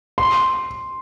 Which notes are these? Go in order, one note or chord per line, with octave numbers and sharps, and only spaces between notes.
C6